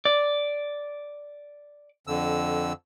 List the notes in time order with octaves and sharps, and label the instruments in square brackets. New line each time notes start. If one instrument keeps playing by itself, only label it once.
[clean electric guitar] D5
[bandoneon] F2 D3 E6